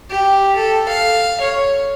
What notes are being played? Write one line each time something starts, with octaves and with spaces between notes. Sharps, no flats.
G4
A4
F5
C#5